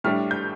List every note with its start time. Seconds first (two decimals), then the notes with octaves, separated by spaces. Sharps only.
0.04 A2 G3 D4 F6
0.31 G6